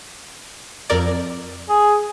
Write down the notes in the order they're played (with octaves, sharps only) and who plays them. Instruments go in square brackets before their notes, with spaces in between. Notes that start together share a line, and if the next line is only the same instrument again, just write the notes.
[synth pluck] F2 A#4 D5
[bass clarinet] G#4